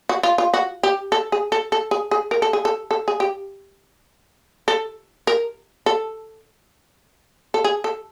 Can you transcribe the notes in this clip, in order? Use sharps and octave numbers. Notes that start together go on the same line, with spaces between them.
F#4
F4
F4
F#4
G4
A4
G#4
A4
A4
G#4
G#4
A#4
A4
G#4
A4
A4
G#4
G4
A4
A#4
A4
A4
G#4
A4